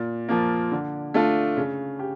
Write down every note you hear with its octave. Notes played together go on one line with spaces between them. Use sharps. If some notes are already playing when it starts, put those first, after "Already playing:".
Already playing: A#2
F3 A#3
D3
A3 D4 F4
C#3
G4